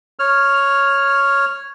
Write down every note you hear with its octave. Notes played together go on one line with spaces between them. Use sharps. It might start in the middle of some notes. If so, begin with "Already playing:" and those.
C#5 F6